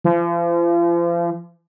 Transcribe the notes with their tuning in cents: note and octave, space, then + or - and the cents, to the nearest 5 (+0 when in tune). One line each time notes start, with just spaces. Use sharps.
F3 -40